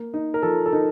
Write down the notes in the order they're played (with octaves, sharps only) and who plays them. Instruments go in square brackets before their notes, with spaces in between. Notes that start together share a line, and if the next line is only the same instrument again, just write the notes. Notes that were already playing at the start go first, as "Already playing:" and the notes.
Already playing: [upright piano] A#3
D#4
[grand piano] A#4
[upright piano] F3 [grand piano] A4
[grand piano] A4
[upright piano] D#4 [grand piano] A#4